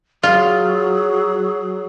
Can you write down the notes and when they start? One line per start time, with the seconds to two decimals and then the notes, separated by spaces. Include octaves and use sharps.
0.23 F#3 F4 G#4